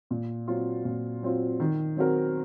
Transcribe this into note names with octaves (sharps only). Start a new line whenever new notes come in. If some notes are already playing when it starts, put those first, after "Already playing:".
A#2
F#3 C4 F4
A#2
F#3 C4 F4
D#3
F#3 C4 F#4 A#4